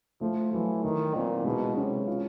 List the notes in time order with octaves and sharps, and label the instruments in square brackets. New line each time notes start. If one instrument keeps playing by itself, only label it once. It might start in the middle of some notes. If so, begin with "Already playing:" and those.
[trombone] F3 [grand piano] A3
[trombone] E3 [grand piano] F#3
[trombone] D#3 [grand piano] E3
[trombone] A#2 [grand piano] C4
[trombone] B2 [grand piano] G#3
[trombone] C3 [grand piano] C#4
[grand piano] F4